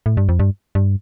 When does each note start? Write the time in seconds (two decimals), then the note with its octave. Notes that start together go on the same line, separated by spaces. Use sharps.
0.06 A2
0.17 G2
0.29 F2
0.39 G2
0.75 G2